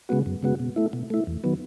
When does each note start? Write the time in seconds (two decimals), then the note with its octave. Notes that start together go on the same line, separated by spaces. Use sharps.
0.09 C#3 G#3 B3 F#4
0.26 F#2
0.43 C#3 G#3 B3 F#4
0.60 B2
0.76 A3 E4
0.93 B2
1.10 A3 E4
1.27 E2
1.44 D#3 F#3 B3